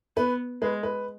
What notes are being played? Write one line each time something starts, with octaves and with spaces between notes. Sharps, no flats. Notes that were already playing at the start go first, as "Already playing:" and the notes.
B3 B4
G#3 B4
B4